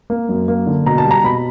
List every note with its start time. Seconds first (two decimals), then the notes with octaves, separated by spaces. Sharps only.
0.10 A#3
0.29 F#2
0.48 A#3
0.67 D3
0.86 B2 A#5
0.98 A5
1.05 G3
1.11 A#5
1.24 B2 B5